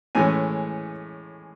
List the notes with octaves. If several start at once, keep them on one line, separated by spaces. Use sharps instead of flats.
A2 E3 G#3 C#4 G#5